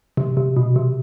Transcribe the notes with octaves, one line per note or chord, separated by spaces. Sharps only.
C3
C3
B2
C3